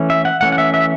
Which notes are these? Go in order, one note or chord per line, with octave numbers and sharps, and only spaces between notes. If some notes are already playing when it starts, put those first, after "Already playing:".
Already playing: E3 A3 C#4
E5
F#5
E3 A3 C#4 F#5
F#5
E5
E5